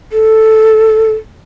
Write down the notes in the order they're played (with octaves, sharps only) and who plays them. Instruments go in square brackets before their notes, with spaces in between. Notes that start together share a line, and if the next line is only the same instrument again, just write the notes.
[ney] A4